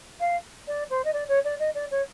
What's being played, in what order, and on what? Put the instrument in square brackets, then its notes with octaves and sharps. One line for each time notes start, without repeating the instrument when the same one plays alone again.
[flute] F5
D5
C5
D#5
D5
C#5
D5
D#5
D5
C#5